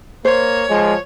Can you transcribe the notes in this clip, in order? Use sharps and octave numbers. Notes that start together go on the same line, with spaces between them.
A#3 C5 C#5
F3 G#3